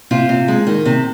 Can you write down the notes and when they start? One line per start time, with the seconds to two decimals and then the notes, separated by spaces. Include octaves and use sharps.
0.11 C3 F4
0.29 C3
0.48 G#3
0.67 D#3
0.86 C3